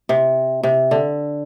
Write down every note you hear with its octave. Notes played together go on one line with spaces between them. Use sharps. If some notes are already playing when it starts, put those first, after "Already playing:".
C3
C3
D3